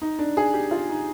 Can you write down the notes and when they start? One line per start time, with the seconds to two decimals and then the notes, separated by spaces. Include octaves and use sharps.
0.02 D#4
0.19 D4
0.37 G#4
0.54 G4
0.71 F4
0.89 D#4